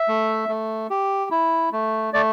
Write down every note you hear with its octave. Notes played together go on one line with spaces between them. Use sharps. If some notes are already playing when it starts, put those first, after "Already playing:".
Already playing: E5
A3
A3
G4
E4
A3
A3 D5